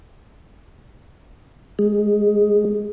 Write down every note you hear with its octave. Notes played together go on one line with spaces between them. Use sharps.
G#3